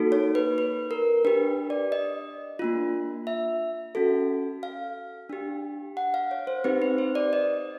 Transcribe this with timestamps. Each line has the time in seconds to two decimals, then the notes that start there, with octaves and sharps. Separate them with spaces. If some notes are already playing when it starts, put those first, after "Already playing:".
Already playing: A#3 D#4 F#4 A4
0.12 C#5
0.35 B4
0.58 B4
0.91 A#4
1.25 D4 G4 B4
1.70 D5
1.92 D#5
2.59 A#3 D4 F4
3.27 E5
3.95 C#4 F#4 A4
4.63 F5
5.30 D4 G4
5.97 F#5
6.14 F5
6.31 C#5
6.47 C5
6.64 C4 D#4 G4 B4
6.82 B4
6.98 C5
7.15 D5
7.33 D#5